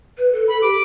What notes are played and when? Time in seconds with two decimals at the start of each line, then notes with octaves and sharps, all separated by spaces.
0.18 B4
0.32 A4
0.47 A4 B5
0.62 G4 D6